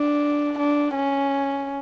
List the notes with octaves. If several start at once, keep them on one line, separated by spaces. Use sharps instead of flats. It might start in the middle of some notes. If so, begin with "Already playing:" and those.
Already playing: D4
D4
C#4